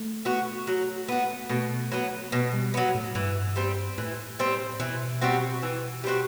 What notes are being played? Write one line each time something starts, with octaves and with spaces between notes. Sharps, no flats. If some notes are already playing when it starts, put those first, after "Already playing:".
Already playing: A3
B3 F#4
F#3
B3 F#4
B2 A3
F#3 B3
B2
G3
F#3 B3
A2
G2 E3
G3 C4
A2 E3
G3 C4
B2 E3
G3 C4 F#4
E3
G3 C4 F#4